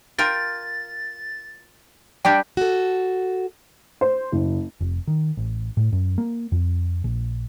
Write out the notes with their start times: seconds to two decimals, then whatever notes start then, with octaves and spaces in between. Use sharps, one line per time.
0.18 F4 A#4 G5 A6
2.25 G3 D4 G4 G5
2.57 F#4 A4
4.01 C5
4.32 F#1
4.81 F1
5.07 D#3
5.37 A1
5.77 A2
5.92 F#2
6.18 A#3
6.52 F2
7.04 A#1